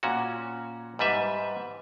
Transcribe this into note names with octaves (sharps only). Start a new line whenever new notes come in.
A#2 C#4 F#4
G#2 G3 B4 E5